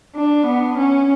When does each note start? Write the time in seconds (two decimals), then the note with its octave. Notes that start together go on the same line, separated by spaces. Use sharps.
0.15 D4
0.46 B3
0.78 C#4